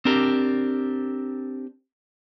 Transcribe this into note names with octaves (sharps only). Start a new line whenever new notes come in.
C4 D4 G4 A#4